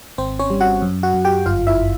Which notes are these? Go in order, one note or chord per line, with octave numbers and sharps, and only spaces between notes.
G#1 C4 C5
C#4 C#5
G3
F#4 F#5
F#2
F#4 F#5
F#2
G4 G5
G1 F4 F5
E4 E5